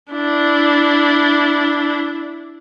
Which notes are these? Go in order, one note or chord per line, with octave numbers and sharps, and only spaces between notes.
D4 E4